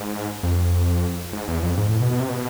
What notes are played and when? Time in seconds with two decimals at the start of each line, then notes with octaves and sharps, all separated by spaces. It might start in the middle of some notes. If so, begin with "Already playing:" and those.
Already playing: G#2
0.43 F2
1.33 G#2
1.48 E2
1.63 F2
1.77 G#2
1.89 A2
2.00 B2
2.11 B2
2.20 C3
2.29 B2